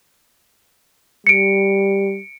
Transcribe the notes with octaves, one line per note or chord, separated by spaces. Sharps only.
G3 C#7 D7